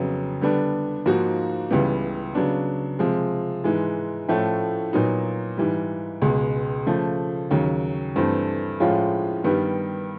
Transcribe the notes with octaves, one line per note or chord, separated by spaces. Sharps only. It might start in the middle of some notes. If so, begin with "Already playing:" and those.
Already playing: F2 C#3 F#3 B3
D3 G3 B3 D4
G#2 F3 A#3 D#4 F#4
C#2 C#3 E3 G3 B3
C#3 F#3 B3 D4
C3 F3 G#3
G#2 E3 G#3
A2 F3 A3 C#4
A#2 F#3 B3 D#4 F#4
G#2 E3 G3
C#2 B2 G#3
C#3 F3 A3
D#2 C#3 F#3
G2 E3 A3 C4
A2 F3 G#3 C#4 F4
G2 D#3 G3 B3